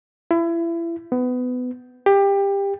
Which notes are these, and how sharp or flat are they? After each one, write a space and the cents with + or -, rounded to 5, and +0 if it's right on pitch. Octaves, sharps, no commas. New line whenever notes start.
E4 +30
B3 +20
G4 +20